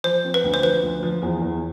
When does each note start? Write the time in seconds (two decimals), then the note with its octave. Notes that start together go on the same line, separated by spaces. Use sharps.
0.04 F3 C5
0.24 C4
0.34 B4
0.44 D2
0.54 C5
0.63 F3 B4
0.83 D2
1.03 F3
1.22 E2
1.42 E2